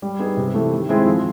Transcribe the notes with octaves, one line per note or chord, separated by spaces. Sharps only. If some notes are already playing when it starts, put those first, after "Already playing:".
G3
B3 D#4 G#4
C3
E3 A3
D#3
G#3 C4 E4 G#4
F3